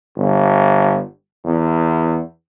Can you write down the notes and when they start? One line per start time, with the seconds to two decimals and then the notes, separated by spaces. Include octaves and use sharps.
0.16 G1
1.45 E2